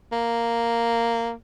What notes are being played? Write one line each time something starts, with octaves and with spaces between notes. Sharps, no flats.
A#3